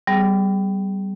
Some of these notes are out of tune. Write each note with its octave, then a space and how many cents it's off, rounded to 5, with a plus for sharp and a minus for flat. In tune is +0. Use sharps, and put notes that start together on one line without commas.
G3 -15 B3 +35 G#4 +5